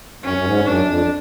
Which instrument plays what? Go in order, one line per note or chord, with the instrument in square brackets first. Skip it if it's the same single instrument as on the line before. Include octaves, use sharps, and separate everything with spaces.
[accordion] F#2 [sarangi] C#4
[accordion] F#2
G#2
[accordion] F#2 [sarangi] D4
[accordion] F2